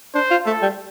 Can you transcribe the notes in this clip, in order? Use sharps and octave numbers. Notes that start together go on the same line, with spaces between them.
D4 C5
F4
A3 A4
G3